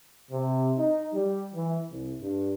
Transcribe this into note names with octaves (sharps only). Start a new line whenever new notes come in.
C3
D#4
G3
E3
C2
G2